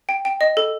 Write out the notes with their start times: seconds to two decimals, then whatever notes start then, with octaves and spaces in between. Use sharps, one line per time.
0.09 G5
0.25 G5
0.41 D#5
0.57 A4